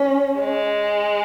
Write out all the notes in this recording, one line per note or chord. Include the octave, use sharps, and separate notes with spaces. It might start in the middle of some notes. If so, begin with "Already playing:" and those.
Already playing: C#4
G#3